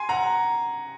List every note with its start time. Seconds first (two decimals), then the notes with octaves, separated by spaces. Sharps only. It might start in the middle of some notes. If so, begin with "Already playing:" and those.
Already playing: G#5 C6
0.09 F#5 A#5